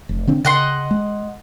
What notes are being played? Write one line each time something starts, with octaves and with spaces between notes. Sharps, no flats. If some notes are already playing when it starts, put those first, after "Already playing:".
F1
D3 C4 D4
C#3 D#5 F#5 C6
G#3